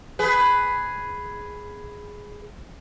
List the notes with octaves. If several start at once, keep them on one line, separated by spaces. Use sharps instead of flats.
G#4 B4